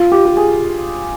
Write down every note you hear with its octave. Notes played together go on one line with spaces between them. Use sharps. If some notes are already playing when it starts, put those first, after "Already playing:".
Already playing: F4
G4
G4
G#4